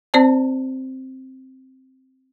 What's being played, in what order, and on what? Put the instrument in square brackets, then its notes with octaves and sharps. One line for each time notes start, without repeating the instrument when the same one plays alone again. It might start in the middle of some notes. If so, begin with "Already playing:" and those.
[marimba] C4 C5 D5 A5